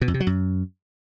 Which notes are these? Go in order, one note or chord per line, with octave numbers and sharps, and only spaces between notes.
B2
F2
C3
F#3
F#2